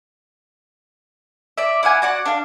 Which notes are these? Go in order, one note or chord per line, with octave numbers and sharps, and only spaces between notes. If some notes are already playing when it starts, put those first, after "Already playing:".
D5 E5
E4 F5 F#5 G#5
F#4 D5 F#5
D4 F5